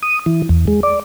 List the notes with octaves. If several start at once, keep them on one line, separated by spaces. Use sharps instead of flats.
D#6
E3
E2
G#3
D5